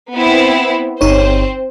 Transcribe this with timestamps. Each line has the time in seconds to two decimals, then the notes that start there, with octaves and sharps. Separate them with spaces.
0.13 B3 C4 E4
1.01 G1 C4 D#4 C5 C#5